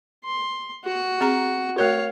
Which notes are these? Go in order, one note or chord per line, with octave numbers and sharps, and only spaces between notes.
C6
F#4 C#6
C4 G#4 A#5
A3 F#4 A#4 C#5 F5